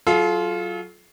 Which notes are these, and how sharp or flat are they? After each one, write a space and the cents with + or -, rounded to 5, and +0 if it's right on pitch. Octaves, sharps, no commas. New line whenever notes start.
F#3 +0 F4 +0 A4 -40